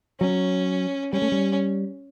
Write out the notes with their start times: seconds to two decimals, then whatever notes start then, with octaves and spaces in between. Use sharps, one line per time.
0.20 F#3 C#4
1.13 G3 C#4
1.22 A3
1.32 G3